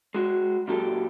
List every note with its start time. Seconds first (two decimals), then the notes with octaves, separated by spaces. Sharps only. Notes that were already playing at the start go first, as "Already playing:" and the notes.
0.14 G#3 F#4
0.68 A#2 F#3 G4 A4